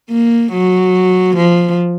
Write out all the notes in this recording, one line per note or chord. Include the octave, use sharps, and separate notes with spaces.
A#3
F#3
F3